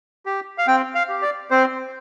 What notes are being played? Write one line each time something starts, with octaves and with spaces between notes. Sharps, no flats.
G4
F5
C4 G5
F5
G4
D5
C4 C5